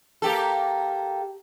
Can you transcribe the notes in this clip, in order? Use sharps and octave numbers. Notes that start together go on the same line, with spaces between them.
A#3 G4 A4